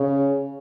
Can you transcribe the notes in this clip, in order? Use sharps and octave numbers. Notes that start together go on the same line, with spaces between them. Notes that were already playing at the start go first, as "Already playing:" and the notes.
Already playing: C#3